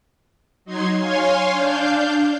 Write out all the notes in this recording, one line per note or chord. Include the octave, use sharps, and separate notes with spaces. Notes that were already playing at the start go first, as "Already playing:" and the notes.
F#3 D#4 C6 G#6
C#5 F5 G#5 C6
D4 F5 G6